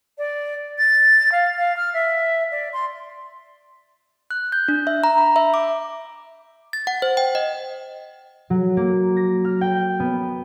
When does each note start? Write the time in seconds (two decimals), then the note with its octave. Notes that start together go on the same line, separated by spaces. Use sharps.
0.18 D5
0.78 A6
1.32 F5
1.57 F5
1.76 F6
1.93 E5
2.51 D5
2.73 C6
4.31 F#6
4.52 G6
4.68 D4
4.87 E5
5.04 A#5
5.18 B5
5.36 E5
5.54 D6
6.73 A6
6.87 F#5
7.02 C5
7.17 G5
7.35 D#5
8.50 F#3
8.77 A#3
9.17 A#6
9.45 F6
9.61 G5
10.00 B3